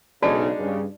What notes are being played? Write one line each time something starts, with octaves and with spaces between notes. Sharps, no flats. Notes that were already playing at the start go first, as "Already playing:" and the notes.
B1 C#3 G#3 D4 D#4 F#4 D5 A5
G2 C#3